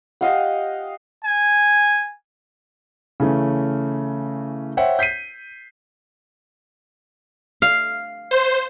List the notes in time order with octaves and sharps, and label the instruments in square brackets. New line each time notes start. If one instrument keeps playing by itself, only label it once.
[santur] G4 D#5 F5 F#5
[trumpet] G#5
[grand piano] C#3 E3 A3 C#4
C5 C#5 E5 F#5 G5
G6 B6 C7 D#7
[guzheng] F5
[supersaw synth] C5